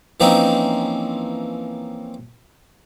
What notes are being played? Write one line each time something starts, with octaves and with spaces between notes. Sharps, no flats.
E3 F3 A#3 C4 C#4 D#4